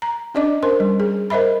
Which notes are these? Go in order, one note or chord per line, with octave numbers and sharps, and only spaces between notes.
A#5
C#4 D4 D5 D#5 D6
C#4 A#4 C5 C6
G3
G#4
A#4 C5 D#5 E5 B5